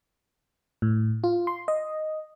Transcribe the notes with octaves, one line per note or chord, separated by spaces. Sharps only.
A2
F4
C6
D#5